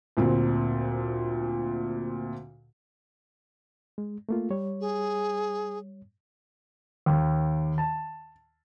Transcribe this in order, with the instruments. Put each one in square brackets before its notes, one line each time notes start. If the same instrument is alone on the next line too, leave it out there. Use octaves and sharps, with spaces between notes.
[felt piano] D2 A#2 C4
[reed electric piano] G#3
A3 A#3 F4
G3 C#5
[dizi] G#4
[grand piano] D#2
A5